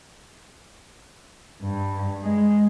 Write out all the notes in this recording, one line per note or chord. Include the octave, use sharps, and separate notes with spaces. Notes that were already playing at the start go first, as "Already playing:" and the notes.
G2
G#3